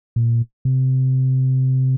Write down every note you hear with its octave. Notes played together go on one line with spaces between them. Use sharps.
A#2
C3